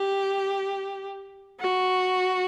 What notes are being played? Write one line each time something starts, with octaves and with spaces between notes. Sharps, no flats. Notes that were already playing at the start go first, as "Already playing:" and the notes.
Already playing: G4
F#4